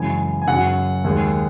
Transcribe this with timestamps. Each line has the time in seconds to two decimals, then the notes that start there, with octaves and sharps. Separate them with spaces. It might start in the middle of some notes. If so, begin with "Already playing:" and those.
Already playing: F#2 C#3 E3 G#3 G#5
0.42 G#5
0.47 F#2 C#3 F#3 F#5
1.04 D#2 D#3 G#3